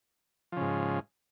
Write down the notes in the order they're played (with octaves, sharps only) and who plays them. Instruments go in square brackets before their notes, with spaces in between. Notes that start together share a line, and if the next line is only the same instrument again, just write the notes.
[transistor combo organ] F3
C#3
G#2